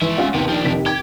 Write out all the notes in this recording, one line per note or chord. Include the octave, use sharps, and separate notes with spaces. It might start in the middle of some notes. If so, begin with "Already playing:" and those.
E3 G#3 E5
C#4 F4 F#5
D#2 C3 B3
F3 D4
F1 D#2 B6
G4 G#6